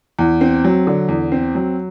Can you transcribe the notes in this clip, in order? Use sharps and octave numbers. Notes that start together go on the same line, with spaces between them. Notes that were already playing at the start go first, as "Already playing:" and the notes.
E2
C4
F#3
D3
E2
C4
F#3